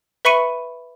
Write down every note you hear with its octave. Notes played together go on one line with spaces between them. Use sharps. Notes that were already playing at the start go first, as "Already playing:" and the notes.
B4 E5 B5 C#6 C#7 D#7